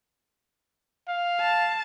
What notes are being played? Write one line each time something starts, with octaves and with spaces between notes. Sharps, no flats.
F5
A5